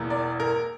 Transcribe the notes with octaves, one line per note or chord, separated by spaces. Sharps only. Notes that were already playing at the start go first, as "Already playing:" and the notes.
Already playing: E1 E2 E3 A#3
D5
A#4